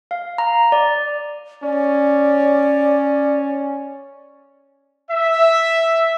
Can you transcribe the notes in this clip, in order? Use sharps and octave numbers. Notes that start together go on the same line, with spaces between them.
F5
A#5
D5
C#4 D5
E5